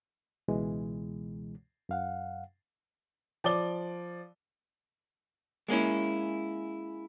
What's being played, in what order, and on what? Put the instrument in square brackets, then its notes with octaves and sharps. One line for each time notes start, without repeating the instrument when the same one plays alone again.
[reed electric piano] C#2 B2 E3 G#3
F#2 F5 F#5
[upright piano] F3 D5 D6 G7
[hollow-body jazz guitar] G#3 A#3 C#4 E4